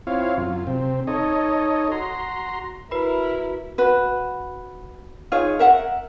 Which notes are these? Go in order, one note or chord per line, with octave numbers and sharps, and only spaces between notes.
C4 E4 F4 C#5 F5
F#2 F4
C3 C4
D#4 A4 C#5 D#5
F#4 A#5 C6
E4 F#4 A#4 B4 B5
F#4 B4
D#4 F4 G#4 C#5
A#4 E5 F#5